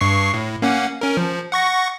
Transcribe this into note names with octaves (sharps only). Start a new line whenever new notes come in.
G2 C#6 C7
A2
A#3 C#4 F#5
C#4 A#4
F3
F#5 C#6 A#6